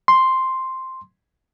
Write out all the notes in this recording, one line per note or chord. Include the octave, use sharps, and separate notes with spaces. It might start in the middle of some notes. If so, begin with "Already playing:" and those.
C6